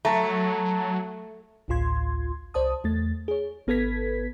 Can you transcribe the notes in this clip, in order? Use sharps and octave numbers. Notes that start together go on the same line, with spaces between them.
F#3 A3 A5 A#5
A1 D2 A2 F4 C6 G#6
C2 C5 D5 A5 D#6
E2 A3 A6
G#4 C#5
G#1 B3 A4 B4 G#6 B6